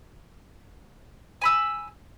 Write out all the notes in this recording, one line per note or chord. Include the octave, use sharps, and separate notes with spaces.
G#5 B5 E6